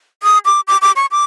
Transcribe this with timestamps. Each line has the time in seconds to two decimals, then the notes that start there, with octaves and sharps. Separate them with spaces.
0.23 D#6
0.45 D6
0.68 D6
0.82 D6
0.96 C#6
1.11 D6